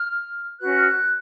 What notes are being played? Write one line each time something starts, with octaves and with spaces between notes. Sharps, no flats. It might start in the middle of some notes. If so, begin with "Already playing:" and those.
Already playing: F6
C#4 F#4 B4 F#6
F6
F#6